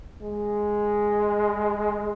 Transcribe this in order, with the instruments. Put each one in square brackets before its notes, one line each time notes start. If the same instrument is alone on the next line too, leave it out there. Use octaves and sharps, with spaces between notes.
[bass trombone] G#3